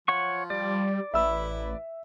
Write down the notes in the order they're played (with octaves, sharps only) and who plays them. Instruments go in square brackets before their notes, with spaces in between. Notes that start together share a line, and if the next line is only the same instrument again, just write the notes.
[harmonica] F3 [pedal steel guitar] C#5 F#5 C#6
[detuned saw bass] G3 [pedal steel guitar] D5
[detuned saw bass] A1 [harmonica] E4 B4 [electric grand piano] E5 E6